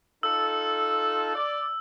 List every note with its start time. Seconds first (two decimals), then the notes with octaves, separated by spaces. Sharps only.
0.23 D#4 F4 A4 E6
1.35 D5